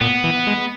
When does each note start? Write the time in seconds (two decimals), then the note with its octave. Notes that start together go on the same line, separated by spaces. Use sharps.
0.01 A#2 B3
0.24 E3
0.47 G#3